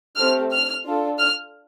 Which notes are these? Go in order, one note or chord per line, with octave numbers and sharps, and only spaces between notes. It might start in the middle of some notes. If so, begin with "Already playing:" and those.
A3 C4 G4 F6
F6
D4 F4 A4
F6